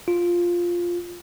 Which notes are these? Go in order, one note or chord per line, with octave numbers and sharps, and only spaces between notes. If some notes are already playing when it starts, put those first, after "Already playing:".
F4